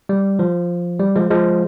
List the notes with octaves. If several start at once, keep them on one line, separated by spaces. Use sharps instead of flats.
G3
F3
G3
F3 G#3
F3 G#3